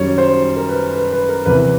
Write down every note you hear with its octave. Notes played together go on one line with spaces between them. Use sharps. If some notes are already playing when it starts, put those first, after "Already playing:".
Already playing: F#2 D#3 G3 C#5
C5
A#4
B4
B4
B4
A#4
E2 C3 E3 B4